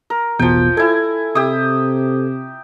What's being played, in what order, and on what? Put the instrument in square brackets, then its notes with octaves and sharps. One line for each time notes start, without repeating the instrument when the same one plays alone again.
[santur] A#4
[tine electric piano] A1 E2 B2 [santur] F3 G5
[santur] E4 G#5 [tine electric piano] A4 G#6
[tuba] C3 [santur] G4 E5 D#6